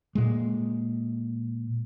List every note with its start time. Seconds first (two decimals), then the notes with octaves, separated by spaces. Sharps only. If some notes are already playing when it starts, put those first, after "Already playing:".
0.15 A#2 G#3